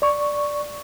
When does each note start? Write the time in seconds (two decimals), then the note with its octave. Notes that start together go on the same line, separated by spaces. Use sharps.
0.02 D5 C#6